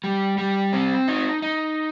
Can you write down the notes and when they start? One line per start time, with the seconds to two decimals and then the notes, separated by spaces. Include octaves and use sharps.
0.04 G3
0.38 G3
0.73 C4
1.08 D#4
1.42 D#4